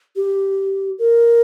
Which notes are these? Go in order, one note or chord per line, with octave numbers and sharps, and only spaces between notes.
G4
A#4